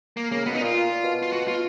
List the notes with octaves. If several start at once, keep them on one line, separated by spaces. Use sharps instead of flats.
A#3
C#3 A#3
B2 B3
D#4
A#2 F4
B2
F4
F#4
F4